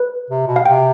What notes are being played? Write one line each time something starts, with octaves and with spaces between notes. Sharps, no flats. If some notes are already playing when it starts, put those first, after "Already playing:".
Already playing: B4
C3
B2
F5
C3 G5